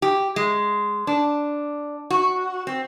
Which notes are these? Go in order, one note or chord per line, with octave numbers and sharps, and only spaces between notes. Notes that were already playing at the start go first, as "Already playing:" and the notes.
G4
G#3
D4
F#4
C4